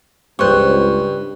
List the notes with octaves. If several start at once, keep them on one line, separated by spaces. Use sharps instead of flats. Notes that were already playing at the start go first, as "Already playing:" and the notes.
C#2 G2 C5 C#6 F#6